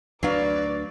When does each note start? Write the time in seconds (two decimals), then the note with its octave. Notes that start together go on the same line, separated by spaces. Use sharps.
0.23 D2 F#3 D4 B4 D5 F5